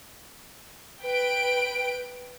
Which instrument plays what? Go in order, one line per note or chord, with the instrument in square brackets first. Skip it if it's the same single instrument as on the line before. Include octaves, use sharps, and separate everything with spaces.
[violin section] B4 G5 D7